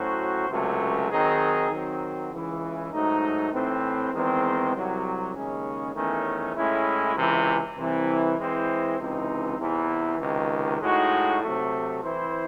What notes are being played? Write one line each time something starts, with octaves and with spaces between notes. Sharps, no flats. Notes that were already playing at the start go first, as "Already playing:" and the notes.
Already playing: A2 F#3 C#4 F#4 C5
C#2 C3 F#3 A3 C#4
D#3 F#3 C4 D#4 G#4
D#3 F#3 C4
C#2 C#3 E3
G#2 F#3 A3 D#4
A2 E3 C4
E2 D#3 G#3 C4
C2 C3 F#3
D#2 C#3 G#3 C#4
E2 D#3 A3 C#4
A2 G#3 C#4 E4
C#2 C3 E3
C2 C3 E3 C4 E4
E3 G#3 C4 E4 C5
C#2 C3 E3 C4 D#4
E2 C3 E3
C#2 C3 D#3
A2 G#3 D#4 F#4
C3 F#3 A3
E3 C4 E4 C5